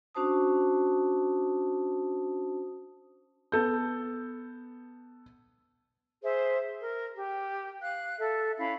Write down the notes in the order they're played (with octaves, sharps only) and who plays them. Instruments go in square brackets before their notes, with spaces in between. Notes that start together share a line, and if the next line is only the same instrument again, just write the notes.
[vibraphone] C#4 D4 F#4 C5 A5 D#6
[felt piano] B3 A4 G6
[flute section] G#4 C5 E5
A#4
G4
F5 F#6
A4 E5
C#4 E4 F5 B5